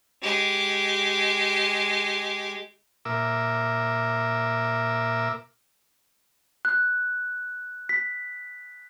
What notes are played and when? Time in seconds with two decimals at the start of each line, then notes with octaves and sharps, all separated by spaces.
0.22 G#3 G4
3.05 A#2 A#4 E5 D6 E6
6.65 F#6
7.89 B6